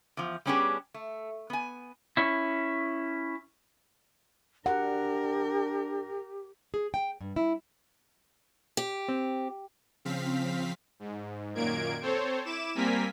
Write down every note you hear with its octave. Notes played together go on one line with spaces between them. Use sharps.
E2 F3
G3 B3 C#4 D4 G4 G#4
A3
B3 G#5
C#4 E4
D4 G4 A#4 F#5
G#4
G5
G2
E4
G4
C4
C#3 F3 C4 F5 B6
G#2
F#2 A#2 D#3 A#3 G#6 D7
C4 A4 C5 C#5
E4 D6 E7
G3 A#3 C4 A#4 G#5 B6